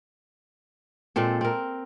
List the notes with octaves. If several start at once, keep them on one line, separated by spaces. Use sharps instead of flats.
A#2 G#3 C4 A4
C4 A#4